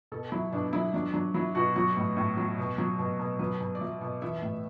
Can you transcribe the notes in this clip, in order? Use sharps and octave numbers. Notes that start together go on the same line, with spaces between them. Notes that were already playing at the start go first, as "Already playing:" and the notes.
B2 A4
F#3 E4
B2 D4
F#3 E4
F#3 D4
F#3 D4
F#3 E4
B2 F#4
F#3 F#4
A2
A2
F#3
B2
F#3
B2
B2
F#3 B4
B2
D5
F#3 E5
B2
E3 E5
A2